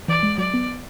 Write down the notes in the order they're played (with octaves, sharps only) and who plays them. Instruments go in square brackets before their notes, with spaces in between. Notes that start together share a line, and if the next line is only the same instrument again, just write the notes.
[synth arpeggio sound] E3 [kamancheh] D5
[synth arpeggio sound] G#3
[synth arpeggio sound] F#3 [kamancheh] D5
[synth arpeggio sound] B3